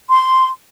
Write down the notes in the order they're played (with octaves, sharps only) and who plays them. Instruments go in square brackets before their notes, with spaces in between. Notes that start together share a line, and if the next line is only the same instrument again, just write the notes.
[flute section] C6